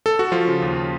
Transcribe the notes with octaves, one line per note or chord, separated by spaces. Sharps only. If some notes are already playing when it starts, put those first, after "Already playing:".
A4
F#4
F3 F4
C#3
D#2